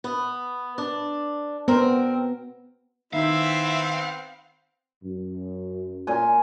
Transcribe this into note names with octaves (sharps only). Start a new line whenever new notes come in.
B3
D4
B3 C4 A#4
D#3 B3 C4 E4 E5 F5
F#2
A#2 G#5